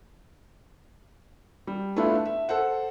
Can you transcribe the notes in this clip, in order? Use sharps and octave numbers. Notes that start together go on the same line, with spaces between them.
G3
A3 B3 D4 E4 F4
E5
A4 C5 F#5